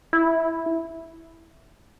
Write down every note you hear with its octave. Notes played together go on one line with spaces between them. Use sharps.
E4